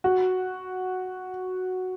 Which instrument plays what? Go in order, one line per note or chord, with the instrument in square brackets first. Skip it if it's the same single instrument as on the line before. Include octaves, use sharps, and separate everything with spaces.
[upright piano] F#4